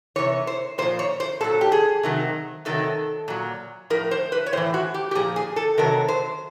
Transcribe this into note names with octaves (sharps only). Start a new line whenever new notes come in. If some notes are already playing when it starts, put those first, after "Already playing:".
C3 E3 C#5
C5
A#2 F3 C5
C#5
C5
A#2 F#3 A4
G4
G#4
C3 D#3 F#3
C3 D#3 F#3 A4
A#2 F#3
A2 F3 A#4
C5
B4
C#5
A2 E3 C5
F#4
G4
G4
A#2 F3 G#4
G#4
A4
C3 D#3 F#3 A#4
C5